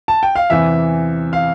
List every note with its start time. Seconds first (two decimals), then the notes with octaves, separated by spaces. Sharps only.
0.08 A5
0.23 G5
0.36 F5
0.50 E2 C3 E3 E5
1.33 F5